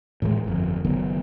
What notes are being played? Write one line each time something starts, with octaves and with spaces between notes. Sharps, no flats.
A2 E3 F3 G#3
G1 F2
F#1 D#3 F#3 B3